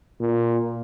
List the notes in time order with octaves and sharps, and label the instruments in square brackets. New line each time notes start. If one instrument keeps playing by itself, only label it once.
[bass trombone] A#2